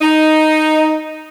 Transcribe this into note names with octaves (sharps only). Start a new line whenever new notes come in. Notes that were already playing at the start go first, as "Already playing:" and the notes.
D#4